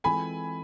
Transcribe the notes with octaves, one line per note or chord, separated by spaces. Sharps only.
E3 G#3 C4 F4 A4 G#5 B5